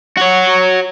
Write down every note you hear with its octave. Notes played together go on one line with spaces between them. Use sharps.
F#4 C#5